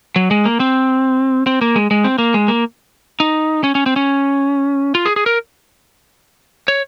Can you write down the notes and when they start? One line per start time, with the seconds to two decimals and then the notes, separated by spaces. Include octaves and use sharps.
0.16 F#3
0.31 G#3
0.46 A#3
0.60 C4
1.47 C4
1.61 A#3
1.76 G#3
1.91 G#3
2.04 C4
2.18 A#3
2.34 G#3
2.48 A#3
3.20 D#4
3.64 C#4
3.75 C#4
3.86 C4
3.96 C#4
4.95 F4
5.06 G#4
5.16 G#4
5.26 A#4
6.68 C#5